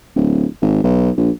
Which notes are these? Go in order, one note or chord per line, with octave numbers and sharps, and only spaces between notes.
D1
G#1
B1
A#1